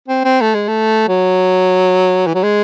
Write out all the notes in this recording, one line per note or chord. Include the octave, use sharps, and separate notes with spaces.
C4
C4
A3
G#3
A3
F#3
E3
F#3
G#3